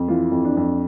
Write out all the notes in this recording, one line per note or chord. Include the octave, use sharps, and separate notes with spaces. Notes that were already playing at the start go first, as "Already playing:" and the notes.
Already playing: F2
E3 F4
F2
D4
F2